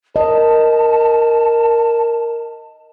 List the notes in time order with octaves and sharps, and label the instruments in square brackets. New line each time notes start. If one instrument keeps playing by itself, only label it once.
[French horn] A#4 [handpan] D#5 [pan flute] A5